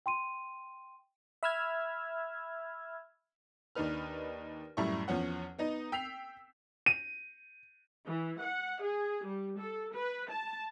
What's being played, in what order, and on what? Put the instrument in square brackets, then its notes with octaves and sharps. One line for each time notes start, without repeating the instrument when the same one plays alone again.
[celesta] G5 C6 D#7
[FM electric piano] E5 B5 E6 F6 G#6
[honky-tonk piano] D#2 D4 D#4 B4 F6
F#2 A2 G3 E4 C#6
E2 F3 C#4 F#5
B3 D#4 D#5
G5 E6 B6 C7 F7
[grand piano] D#7
[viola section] E3
F#5
G#4
G3
A4
B4
A5